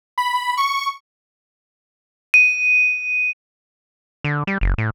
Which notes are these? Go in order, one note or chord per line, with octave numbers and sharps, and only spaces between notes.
B5
C#6
D#7
D3
G3
F#1
A2